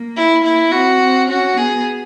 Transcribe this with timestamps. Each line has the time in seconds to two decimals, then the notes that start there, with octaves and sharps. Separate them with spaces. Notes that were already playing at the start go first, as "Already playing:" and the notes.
Already playing: A#3
0.16 E4
0.44 A#3 E4
0.72 C4 F#4
1.01 C4
1.29 C#4 F#4
1.57 B3 G#4